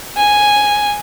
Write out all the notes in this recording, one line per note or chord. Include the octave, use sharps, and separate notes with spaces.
G#5